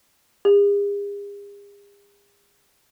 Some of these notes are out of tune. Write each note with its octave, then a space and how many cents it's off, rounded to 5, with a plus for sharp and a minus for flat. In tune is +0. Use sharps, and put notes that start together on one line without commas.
G#4 -45